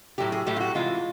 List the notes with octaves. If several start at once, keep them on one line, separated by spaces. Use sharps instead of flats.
A2 F#3 A3 G4
G#4
A2 F#3 A3 G4
F4
F#4
C3 E3 G#3 F4